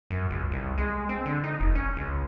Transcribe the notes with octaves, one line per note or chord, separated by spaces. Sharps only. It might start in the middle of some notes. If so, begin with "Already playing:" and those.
F#2
C#2
C2
G#3
C4
D3
D#4
F1
C#4
C#2